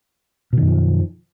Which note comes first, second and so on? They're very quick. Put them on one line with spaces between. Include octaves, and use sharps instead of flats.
B2 D#3 F#2 F3